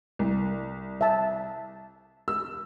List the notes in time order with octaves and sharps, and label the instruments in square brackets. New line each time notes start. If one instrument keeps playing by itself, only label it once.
[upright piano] C2
[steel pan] E5 A5
[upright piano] E6